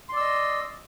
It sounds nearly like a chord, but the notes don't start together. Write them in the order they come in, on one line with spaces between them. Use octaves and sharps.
C6 D5 E6 D#5